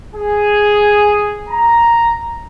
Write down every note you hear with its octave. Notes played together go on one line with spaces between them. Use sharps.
G#4
A#5